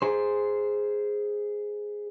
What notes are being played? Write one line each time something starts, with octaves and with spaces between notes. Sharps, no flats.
G#4 C5